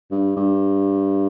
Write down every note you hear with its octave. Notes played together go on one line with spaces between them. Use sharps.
G2
G2